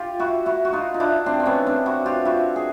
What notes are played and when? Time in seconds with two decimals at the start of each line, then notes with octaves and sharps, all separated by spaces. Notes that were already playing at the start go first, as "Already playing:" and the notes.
Already playing: F4 G4
0.20 E4 F#4
0.46 E4 F#4
0.65 F#4
0.72 D#4 F4
0.94 D#4
1.00 D4 E4
1.26 C4 D4
1.40 C4
1.45 B3 C#4
1.66 C4 D4
1.86 E4 F#4
2.06 F4 G4
2.25 E4 F#4
2.56 G#4